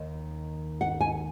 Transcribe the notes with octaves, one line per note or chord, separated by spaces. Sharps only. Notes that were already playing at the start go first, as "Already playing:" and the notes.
Already playing: D#2 D#3
F#5
G#5